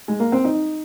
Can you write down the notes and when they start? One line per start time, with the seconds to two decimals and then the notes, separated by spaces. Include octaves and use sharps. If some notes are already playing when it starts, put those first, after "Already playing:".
0.08 G#3
0.20 A#3
0.32 C4
0.44 D#4